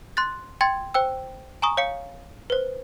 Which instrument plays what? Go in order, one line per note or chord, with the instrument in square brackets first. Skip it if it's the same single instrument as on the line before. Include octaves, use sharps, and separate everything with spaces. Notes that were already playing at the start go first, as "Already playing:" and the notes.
[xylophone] C6 F#6 A6
G5 C6 G#6 A6
C5 G5 E6
G#5 A#5 C#6 D#6
C#5 F5 C#7
B4 C5